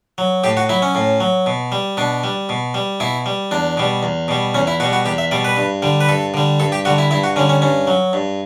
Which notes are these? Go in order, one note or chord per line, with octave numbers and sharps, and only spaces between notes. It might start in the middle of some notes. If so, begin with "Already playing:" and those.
F#3
A2 G4
F#4
F#3 E4
C#4
A2
F#3
B2
G3
B2 D4
G3
B2
G3
B2 E4
G3
E2 D4
B2 G3
E2
B2 G3
E2 C#4
E4
B2 G3 F#4
F#4
E2 G4
E5
B2 G3 D5
B4
G2
D3 G3
B4
G2 A4
D3 G3
G2 A4
G4
D3 G3 F#4
E4
G2 E4
F#4
D3 G3 C#4
C#4
G2 C#4
F#3
G2